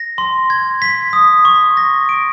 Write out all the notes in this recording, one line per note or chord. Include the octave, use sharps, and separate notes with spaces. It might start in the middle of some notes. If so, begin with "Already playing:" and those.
Already playing: A#6
C6
G#6
B6
D#6
C#6
A#6
D7